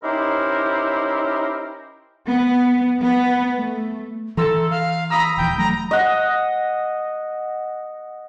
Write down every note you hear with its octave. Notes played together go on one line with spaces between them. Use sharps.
C#4 D#4 E4 G4 A#4 C5
B3
B3
A3
E3 A4 A#5 C6 E6
F5
A#5 B5 D#6 E6
D#1 E3 G5
F#3 A3 A#5
D#5 F#5